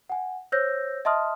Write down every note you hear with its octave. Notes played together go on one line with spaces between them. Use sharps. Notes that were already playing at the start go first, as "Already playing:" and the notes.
F#5 G#5
C5 C#5 E6 G6 A#6
D#5 E5 A5 C6 D#6 F6